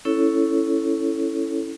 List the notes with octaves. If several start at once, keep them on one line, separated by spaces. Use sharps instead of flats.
C#4 E4 A4 C#5